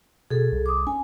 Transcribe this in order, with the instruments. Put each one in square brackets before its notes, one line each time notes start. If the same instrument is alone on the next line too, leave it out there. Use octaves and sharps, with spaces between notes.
[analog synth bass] B2 [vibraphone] G#4 A4
[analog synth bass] C2
[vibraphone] D6 D#6
[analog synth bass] C#4 [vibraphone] G#5